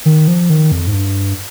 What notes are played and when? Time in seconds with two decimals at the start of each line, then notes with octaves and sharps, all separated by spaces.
0.05 D#3
0.28 F3
0.50 D#3
0.72 F2
0.87 G#2
0.93 G2